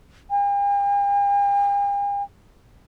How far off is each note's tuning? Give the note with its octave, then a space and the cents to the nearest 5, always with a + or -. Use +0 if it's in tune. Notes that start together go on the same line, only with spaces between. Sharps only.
G5 +45